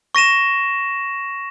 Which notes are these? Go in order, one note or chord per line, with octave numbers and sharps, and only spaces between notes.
C#6 A#6 D#7 E7